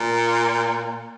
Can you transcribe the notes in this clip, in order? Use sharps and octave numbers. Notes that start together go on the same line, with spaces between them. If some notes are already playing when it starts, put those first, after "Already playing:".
Already playing: A#2